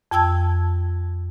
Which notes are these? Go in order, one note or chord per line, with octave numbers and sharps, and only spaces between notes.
F2 G5 A5 E6 G#6